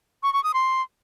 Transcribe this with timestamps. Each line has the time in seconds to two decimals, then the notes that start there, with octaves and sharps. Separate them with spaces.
0.23 C#6
0.33 C#6
0.44 D#6
0.54 C6